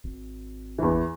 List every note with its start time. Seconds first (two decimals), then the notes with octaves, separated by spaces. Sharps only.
0.04 G#1
0.78 E2 E3